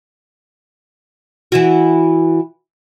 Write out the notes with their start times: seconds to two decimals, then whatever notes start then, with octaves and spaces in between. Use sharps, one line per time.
1.52 E3 E4 F#4